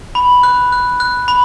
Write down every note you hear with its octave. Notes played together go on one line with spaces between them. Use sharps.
B5
F#6
F#6
F#6
B5